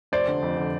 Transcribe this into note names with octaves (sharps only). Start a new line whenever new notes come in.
F1 C5 D5
D3
F2
D3